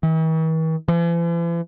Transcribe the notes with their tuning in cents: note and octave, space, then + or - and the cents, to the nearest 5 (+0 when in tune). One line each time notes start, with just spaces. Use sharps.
E3 -45
E3 +45